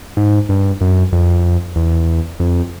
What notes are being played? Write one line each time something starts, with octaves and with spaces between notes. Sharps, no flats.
G#2
G2
F#2
F2
E2
F2